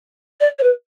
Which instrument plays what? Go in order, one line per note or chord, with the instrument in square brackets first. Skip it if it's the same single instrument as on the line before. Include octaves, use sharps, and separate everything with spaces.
[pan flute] D5
C#5
B4